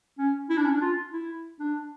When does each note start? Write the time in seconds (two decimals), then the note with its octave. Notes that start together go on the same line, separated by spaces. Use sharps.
0.19 C#4
0.50 E4
0.58 D4
0.65 C#4
0.72 D4
0.82 F4
1.13 E4
1.60 D4